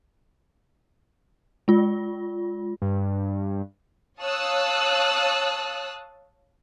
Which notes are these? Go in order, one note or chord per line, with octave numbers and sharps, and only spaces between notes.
G#3 F4
G2
C#5 F5 A5 D#6 E6 F#6